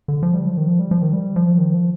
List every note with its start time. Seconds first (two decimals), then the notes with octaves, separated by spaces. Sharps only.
0.08 D3
0.23 F3
0.34 G3
0.46 F3
0.57 D#3
0.68 F3
0.79 G3
0.91 F3
1.02 D#3
1.13 G3
1.36 F3
1.58 D#3
1.74 F3